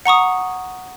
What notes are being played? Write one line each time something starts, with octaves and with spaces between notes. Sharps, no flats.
F#5 A#5 C#6 D#6